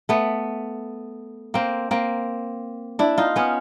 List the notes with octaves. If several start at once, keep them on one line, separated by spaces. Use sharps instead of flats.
A3 B3
A#3 C4
A#3 C4
D4 E4
D#4 F4
B3 C#4